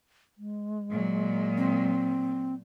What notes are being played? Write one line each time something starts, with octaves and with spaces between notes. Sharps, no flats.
G#3
A#2 F#3
C4